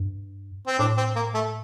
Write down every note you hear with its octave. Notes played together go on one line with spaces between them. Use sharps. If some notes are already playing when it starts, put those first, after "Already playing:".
Already playing: G2
C4
A2 D4
C4
A#3
A3